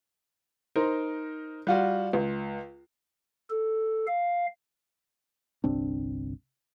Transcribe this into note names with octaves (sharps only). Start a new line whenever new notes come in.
D#4 A#4 C5
G3 F4 F#4
C#2
A4
F5
G1 C2 C4 D4